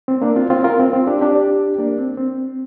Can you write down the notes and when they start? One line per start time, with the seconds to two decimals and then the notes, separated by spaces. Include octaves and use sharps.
0.08 C4
0.22 A#3 D4
0.36 C4 F4
0.50 C4 F4
0.64 F4 A#4
0.80 C4
0.93 C4 F4
1.07 D4 G4
1.21 D4 G4
1.78 A#3 D4
1.98 C4
2.17 C4